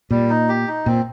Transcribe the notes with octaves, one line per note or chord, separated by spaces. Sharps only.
A#2 G3
D#4
G4
D#4
A#2 C4